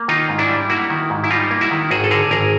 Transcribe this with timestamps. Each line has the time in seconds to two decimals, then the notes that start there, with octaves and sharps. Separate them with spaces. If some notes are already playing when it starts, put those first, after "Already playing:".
Already playing: A#3
0.08 D#3 D#4 F4
0.29 G#2
0.38 D4 E4
0.49 G3
0.69 A#3 E4 F#4
0.90 D#3
1.10 G#2
1.24 E4
1.30 G3 D#4 F4
1.51 A#3
1.61 E4 F#4
1.71 D#3
1.91 G#1 F#4 G#4
2.04 A4
2.11 D3 G#4 A#4
2.31 G#1 G#4 A#4